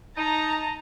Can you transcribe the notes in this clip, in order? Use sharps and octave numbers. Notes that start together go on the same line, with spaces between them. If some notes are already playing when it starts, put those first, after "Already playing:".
D#4 A5 A#5